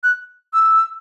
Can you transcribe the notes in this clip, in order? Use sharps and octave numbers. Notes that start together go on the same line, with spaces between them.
F#6
E6